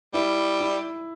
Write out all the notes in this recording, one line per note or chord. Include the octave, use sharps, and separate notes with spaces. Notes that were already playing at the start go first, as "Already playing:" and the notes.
G3 E4
E4